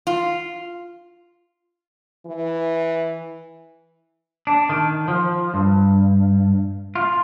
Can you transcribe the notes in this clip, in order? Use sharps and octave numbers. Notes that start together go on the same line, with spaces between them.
F4
E3
D4
D#3
F3
G2
F4